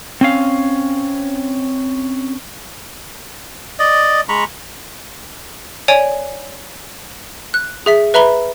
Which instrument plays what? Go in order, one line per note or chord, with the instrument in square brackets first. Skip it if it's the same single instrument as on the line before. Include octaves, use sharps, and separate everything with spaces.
[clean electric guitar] C4 C#4 F5
[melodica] D5 D#5
G#3 A#5 B5 C#6
[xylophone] C#5 D5 G#5 D7 F7
F#6
G#4 E5 B6
B4 E5 A#5 B5 G7